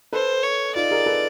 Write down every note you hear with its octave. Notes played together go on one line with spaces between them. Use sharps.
A4 B4 C5
C#5
D#4 F4 D5
G#4 A#4
A4 B4